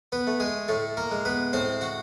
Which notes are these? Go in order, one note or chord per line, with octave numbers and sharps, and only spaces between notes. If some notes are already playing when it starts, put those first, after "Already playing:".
B3 B4
A3
G#3 G#4
A2 A3 A4
A#3 A#4
G#3
B3 B4
A2 C4 C5
F#4 F#5